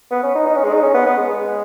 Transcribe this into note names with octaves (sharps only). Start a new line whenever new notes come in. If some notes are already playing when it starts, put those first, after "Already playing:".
B3
C#4
D#4
D#4
C#4
G#3
D#4
C#4
B3
B3
G#3